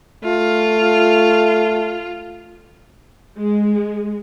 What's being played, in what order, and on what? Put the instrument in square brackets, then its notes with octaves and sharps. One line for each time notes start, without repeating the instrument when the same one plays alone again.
[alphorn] A3 [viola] F4
[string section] G#3